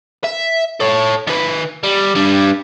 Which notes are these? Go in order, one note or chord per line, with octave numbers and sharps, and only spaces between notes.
E5
A4 C#5
D#3 B4
G3
G3 D4